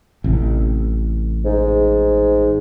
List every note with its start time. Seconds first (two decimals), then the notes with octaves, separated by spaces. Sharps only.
0.24 A1 C3
1.45 G#2